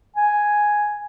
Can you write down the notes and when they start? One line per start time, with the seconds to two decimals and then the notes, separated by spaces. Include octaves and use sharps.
0.16 G#5